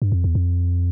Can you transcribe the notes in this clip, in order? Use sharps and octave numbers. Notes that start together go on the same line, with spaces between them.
G2
F2
E2
F2